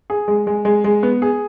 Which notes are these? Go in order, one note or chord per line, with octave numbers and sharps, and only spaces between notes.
G#4
G#3
G#3
G#3
G#3
B3
G#4